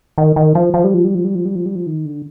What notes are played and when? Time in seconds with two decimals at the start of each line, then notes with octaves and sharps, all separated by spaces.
0.18 D#3
0.36 D#3
0.55 F3
0.74 F3
0.84 G3
0.94 F3
1.04 G3
1.15 F3
1.24 G3
1.35 F3
1.45 G3
1.55 F3
1.66 G3
1.75 F3
1.86 D#3
2.05 D3